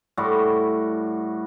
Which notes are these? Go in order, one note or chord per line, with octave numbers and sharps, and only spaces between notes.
A2 G3 F#4 C6